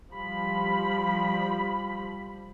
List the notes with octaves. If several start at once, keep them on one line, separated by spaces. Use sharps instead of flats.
F3 G3 B5